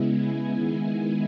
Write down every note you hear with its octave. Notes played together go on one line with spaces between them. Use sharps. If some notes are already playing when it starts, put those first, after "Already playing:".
Already playing: C#3 G#3 B3 E4
G#5
D#3 G#3 B3 E4